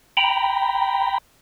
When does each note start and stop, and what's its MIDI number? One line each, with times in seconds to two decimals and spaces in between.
0.17 1.18 79
0.17 1.18 82
0.17 1.18 83